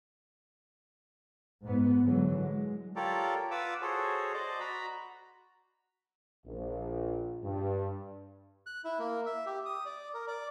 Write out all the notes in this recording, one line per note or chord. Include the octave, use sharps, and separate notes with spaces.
G#2 B3
D3 E3 F#3 G#3
G#3
F4 G4 A4 A#4 C#5 D5
F4 B4 F#5 D6 E6
F#4 G#4 A4 C5 C#5
C5 D5 D#5
F#4 A#5 B5
A#1
G2
F#6
E4
A#3
E5
G4
D#6
D5
A#4
D5